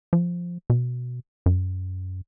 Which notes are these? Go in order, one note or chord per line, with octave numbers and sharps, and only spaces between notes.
F3
B2
F#2